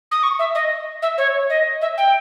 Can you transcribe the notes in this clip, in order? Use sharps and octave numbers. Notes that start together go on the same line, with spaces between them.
D#6
C#6
E5
D#5
E5
C#5
D#5
E5
G5